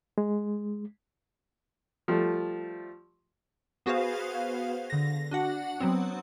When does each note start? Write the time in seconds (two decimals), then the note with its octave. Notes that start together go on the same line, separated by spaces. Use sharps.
0.18 G#3
2.08 F3 G3 A3
3.86 B3 F#4 G#4 B4 C5 F5
4.90 D3 A#6
5.31 D4 F#4 F#5
5.80 F#3 B3 C4